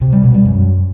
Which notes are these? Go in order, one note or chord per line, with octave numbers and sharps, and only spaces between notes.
C3
G3
B2
G3
F#2